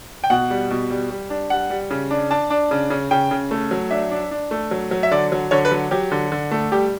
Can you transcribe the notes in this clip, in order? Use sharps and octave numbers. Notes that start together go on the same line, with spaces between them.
G5
B2 F#5
G3
B2
G3
G3
D4
G3 F#5
G3
C#3
D4
D4 A5
D4
C#3
C#3
C#3 G5
C#3
A3
F#3
D4 E5
D4
D4
A3
F#3
F#3
E5
D3 D5
F#3
D3 C#5
B4
F#3
F#3 G4
D3
D3
A3
G3 G4